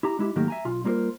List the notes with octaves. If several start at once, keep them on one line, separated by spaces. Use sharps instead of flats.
E4 G4 A#5
G#3 E4 G4
G#2 D#3 F#3 A3 A#3 G4
E5 G#5 A#5
B1 F4
G3 A#3 F4 G#4 A#4 C5